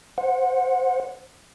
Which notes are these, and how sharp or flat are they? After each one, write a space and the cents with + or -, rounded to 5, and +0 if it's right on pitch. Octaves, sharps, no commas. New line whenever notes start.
C5 +0 F#5 -20